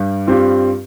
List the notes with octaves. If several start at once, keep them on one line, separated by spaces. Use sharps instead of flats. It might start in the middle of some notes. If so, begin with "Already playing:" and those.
Already playing: G2 G3
G2 G3 C4 F4